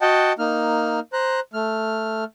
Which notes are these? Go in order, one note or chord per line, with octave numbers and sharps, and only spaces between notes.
F#4 D#5 F#5 G5 A5
A#3 D#4 F6
C5 A#5 F#6
A3 F6